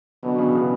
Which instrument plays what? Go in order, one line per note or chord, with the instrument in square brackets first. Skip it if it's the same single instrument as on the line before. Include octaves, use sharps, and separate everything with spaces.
[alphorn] B2 [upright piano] D3 F#3
[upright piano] C#3 E3
C#3 E3